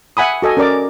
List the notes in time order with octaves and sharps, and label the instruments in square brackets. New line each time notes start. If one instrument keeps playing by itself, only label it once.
[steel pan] E5 F#5 G#5 B5 D#6
F#4 A4 D#5 G#5
C#4 A#4 D5 D6